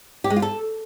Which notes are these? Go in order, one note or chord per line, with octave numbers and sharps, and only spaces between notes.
G4
G#3
F4
A4